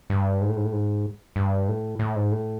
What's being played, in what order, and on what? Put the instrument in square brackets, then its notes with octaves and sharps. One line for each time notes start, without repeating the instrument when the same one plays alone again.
[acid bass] G2
G#2
A2
G#2
A2
G#2
G2
A2
A2
G#2
A2